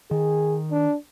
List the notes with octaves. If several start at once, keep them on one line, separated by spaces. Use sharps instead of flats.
D#3 G#4
D4